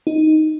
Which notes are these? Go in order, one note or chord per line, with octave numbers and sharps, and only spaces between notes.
D#4